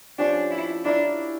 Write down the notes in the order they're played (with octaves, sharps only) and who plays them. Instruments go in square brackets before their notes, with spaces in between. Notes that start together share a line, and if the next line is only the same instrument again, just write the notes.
[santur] F3 C#4 G4 [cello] D4
[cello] E4
[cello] D4 [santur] E4 A#4 E5